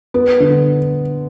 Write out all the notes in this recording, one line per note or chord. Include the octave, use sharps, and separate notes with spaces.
B3
D3